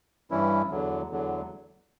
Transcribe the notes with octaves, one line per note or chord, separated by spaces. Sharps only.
G2 E3 G3 C#4 E4
E2 D3 F#3
E2 D3 F#3